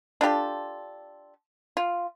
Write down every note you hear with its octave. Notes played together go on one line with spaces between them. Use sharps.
D4 F4 G4 A4
F4